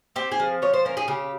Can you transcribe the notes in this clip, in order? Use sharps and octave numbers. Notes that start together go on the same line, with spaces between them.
C4 G4
G#4
F3
F3 C#5
C5
C#4 A#4
G#4
C#3 G4